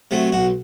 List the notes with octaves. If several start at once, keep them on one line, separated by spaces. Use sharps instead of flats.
C3 F#3 A3
B1 F#4